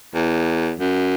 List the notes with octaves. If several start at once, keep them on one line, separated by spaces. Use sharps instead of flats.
E2
F#2